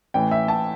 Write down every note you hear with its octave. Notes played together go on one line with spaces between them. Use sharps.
A1 A2 E3 G5
E5
A5